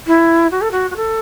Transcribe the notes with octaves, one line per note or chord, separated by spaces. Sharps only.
E4
F#4
A4
F#4
F#4
A4